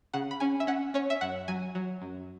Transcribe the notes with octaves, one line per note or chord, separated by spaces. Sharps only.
C#3 F#5
B5
C#4 G#5
E5
C#4 F#5
C#4 C#5
E5
F#2 F#5
F#3 G#5
F#3
F#2